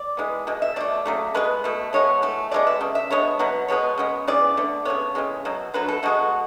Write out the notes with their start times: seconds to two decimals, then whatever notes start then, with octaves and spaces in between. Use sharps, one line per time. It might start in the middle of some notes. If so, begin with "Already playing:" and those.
Already playing: D5
0.17 E3 G#3 B3
0.47 B2 G#3
0.62 E5
0.76 B2 A3 D5
1.06 C#3 F#3 A3
1.34 B2 G#3 B3 B4
1.64 B2 A3
1.93 B2 G#3 B3 C#5
2.22 E3 A3
2.51 B2 G#3 B3 D5
2.67 E5
2.81 C#3 F#3
2.95 E5
3.11 D3 G#3 B3 C#5
3.39 B2 F#3 B3
3.68 B2 G#3 B3 C#5
3.98 C#3 G#3 B3
4.27 C#3 E3 B3 D5
4.57 D3 A3
4.85 C#3 G#3 B3 C#5
5.15 C#3 E3 G#3
5.45 B2 F#3
5.74 D3 F#3 A3 B4
5.88 A4
6.03 B2 G#3 B3 F#4